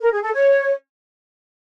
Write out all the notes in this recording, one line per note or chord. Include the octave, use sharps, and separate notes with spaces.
A#4
G#4
A4
C#5